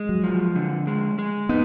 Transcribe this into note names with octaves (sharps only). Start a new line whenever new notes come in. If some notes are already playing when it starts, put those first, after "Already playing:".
Already playing: G#3
F#3
F3
D3
G#3
G#3
B3 D#4